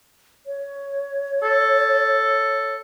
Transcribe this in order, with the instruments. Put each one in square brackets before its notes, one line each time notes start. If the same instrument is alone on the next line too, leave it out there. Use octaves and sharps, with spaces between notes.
[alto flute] C#5
[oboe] A4